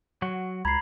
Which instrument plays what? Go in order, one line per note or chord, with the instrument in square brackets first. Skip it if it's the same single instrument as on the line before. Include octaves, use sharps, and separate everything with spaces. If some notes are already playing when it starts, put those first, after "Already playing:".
[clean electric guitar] F#3 F#4
[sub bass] C#2 [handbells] A#5 B5 [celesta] G#6 C7